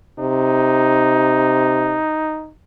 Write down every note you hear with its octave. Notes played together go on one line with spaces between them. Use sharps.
C3 D#4